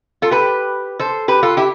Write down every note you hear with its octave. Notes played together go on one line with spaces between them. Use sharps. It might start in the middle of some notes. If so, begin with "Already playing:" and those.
F4 A4
G4 B4
A4 C5
G4 B4
F4 A4
E4 G4